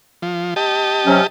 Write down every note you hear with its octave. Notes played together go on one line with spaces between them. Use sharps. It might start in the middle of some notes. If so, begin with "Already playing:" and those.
F3
G4 D#5 A5
C3 F#3 C#4